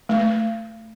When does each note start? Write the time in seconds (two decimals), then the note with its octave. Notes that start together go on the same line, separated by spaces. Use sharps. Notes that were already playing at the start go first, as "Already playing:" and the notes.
0.09 A3